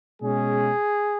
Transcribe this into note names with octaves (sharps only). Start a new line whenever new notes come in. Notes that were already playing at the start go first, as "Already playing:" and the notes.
B2 G#3 C#4 G#4